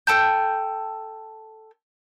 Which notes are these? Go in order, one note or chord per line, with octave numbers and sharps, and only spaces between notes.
A4 G5 A5 G6